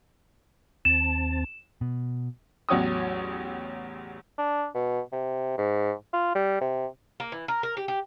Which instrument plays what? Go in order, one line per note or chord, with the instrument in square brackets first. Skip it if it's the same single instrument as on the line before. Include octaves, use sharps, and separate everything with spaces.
[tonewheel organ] D#2 C4 A5 [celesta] E7
[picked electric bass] B2
[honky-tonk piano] A1 E2 F#3 C#5 G5 D#6
[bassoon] D4
B2
C3
G#2
F4
G3
C3
[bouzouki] A#3
E3
A#4
A#4
G4
G4